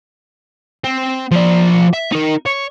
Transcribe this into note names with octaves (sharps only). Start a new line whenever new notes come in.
C4
F3 D5
E5
D#4 A#4
C#5